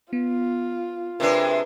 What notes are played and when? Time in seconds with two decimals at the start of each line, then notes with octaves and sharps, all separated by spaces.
0.13 B3 F4
1.20 C3 G#3 D4 A#4 B4